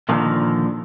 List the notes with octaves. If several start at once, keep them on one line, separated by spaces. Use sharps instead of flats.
A#2 D3 D#3 F3